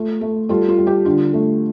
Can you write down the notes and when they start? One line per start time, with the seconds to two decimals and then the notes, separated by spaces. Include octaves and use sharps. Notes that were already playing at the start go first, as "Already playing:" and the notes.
Already playing: A3 F4
0.21 A3
0.49 G3 F4 A4
0.69 F4
0.78 G3
0.87 G4
1.05 D3 F4
1.33 A3